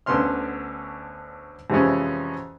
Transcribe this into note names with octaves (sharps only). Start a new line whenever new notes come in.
D2 D3 B3 C#4 C6 F6
F2 C3 E3 G#3 C#4